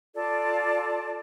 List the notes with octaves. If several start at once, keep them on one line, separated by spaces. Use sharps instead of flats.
F4 A4 D5 A5